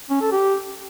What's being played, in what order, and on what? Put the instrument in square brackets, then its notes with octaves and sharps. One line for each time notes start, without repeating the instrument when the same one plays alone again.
[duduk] C#4
A4
G4